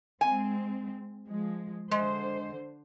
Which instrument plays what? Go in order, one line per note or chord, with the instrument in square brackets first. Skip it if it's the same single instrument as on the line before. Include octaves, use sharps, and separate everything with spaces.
[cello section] G#3 C4 [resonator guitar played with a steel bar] G#5
[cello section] F3 G#3
[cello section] D3 C5 [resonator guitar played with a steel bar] G#3